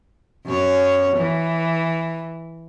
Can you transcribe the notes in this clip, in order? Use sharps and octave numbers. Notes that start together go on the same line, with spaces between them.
F#2 C#5
E3